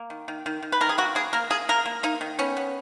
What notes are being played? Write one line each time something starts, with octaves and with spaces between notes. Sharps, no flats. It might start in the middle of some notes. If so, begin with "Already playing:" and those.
Already playing: A#3
D#3
D#3
D#3
D#3
B4
D#3 A#4
G#4
A#3 F#4
A#3 G#4
A#3 A#4
A#3 G#4
A#3 A#4
A#3
A#3 D#4
D#3
B3 C#4
B3